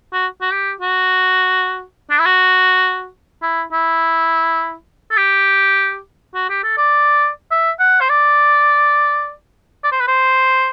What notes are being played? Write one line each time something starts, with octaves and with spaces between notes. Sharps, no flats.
F#4
F#4
G4
F#4
D4
E4
F#4
E4
E4
A4
G4
F#4
G4
A4
D5
E5
F#5
C5
D5
D5
C5
B4
C5